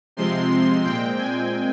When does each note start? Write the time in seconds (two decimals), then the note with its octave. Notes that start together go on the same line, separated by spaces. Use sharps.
0.17 C3 F3 G#3 C4 C6
0.85 A#2 G#3 C4 G5
1.19 G#5